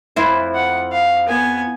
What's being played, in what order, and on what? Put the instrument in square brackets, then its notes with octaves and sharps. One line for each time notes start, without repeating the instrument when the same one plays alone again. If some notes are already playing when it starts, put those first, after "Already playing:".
[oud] F2 E4 C5
[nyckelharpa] F#5
F5
B3 G#5